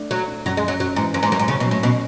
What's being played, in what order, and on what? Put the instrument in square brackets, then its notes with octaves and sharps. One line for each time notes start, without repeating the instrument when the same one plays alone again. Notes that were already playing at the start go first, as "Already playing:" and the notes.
Already playing: [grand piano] A3 D4
[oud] F#3 [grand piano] A3
[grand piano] D4
[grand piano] F#2 [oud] F#3
[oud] G#3
[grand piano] F#2
[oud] F#3
[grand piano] F#2 [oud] F#3
[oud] G#2 [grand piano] E3
[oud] F#2 [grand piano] C#4
[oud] G#2
[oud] F#2 [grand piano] F#3
[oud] G#2
[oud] C#3 [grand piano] C#4
[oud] B2
[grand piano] F#3
[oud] A2
[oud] B2 [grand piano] C#4